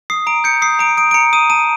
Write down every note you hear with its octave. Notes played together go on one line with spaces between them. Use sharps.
D#6 C7
A#5 D7
G6 C#7
D#6 C7
A#5 D7
D#6 D7
D7
A#5 C#7
D#6 D#7
A5 D#7